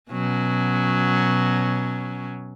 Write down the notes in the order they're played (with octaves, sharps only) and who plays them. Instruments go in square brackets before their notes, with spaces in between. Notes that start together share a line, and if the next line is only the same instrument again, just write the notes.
[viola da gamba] B2 F#3 C#4